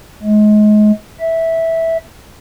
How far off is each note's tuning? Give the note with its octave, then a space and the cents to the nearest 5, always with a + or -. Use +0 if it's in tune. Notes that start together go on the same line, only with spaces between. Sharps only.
G#3 +30
E5 -10